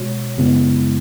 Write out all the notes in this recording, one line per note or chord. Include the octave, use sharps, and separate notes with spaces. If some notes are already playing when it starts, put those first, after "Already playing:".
Already playing: B2 G#3 F#4 C#5
F#2 C#3 G#3 B3 E4